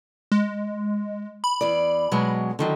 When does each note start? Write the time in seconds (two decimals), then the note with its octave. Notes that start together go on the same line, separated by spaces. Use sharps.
0.32 G#3
1.44 B5
1.61 E2 D5
2.11 B2 F#3 G#3
2.59 D3 D#3 F#3